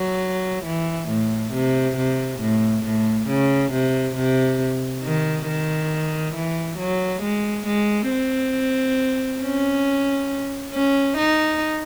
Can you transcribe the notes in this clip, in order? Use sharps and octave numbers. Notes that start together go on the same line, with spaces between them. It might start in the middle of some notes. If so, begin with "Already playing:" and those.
Already playing: F#3
E3
A2
C3
C3
A2
A2
C#3
C3
C3
D#3
D#3
E3
F#3
G#3
G#3
C4
C#4
C#4
D#4